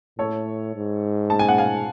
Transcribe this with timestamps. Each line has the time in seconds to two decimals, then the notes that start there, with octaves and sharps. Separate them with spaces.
0.19 A2 A4 C#5
0.75 G#2
1.30 A5
1.39 G#5
1.48 F#5
1.58 F5 G#5